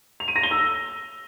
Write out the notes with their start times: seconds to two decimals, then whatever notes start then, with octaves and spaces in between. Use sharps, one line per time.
0.20 F7
0.28 D#7
0.36 A#6
0.43 G7
0.51 E6